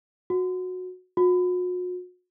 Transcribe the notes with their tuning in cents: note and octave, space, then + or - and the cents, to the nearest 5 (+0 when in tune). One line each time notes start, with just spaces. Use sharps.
F#4 -15
F#4 -40